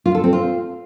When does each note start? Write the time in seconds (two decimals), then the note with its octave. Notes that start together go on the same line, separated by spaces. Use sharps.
0.06 F4
0.15 A4
0.24 C4
0.33 F4